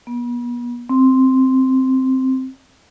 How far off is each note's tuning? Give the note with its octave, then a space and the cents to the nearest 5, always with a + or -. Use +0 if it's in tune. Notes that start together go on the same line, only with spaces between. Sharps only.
B3 -40
C4 +0